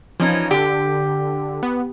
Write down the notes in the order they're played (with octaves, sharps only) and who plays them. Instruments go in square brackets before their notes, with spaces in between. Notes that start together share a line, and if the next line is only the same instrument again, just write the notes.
[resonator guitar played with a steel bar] E3 C#4 D#4 [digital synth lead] F3
[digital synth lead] D3 [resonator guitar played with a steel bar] G4
[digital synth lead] B3